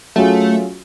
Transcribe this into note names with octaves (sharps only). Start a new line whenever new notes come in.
F#3 A3 C#4 F4 G#4